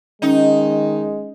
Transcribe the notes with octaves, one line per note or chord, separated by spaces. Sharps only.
D#3 G#3 C#4 D#4